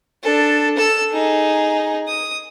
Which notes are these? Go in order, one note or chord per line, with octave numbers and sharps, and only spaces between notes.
D4 A4
A4 E6
D#4 G#4
D#6